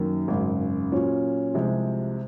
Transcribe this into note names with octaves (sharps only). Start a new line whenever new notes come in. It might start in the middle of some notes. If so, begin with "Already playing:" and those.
Already playing: F#2 D#3 F#3 A#3
G#1 F#2 C#3
A#2 F#3 C#4 F4
C2 C3 F3 G#3